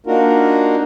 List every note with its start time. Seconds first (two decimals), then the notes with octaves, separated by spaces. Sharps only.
0.06 A#3 D4 D#4 F4 F#4 A#4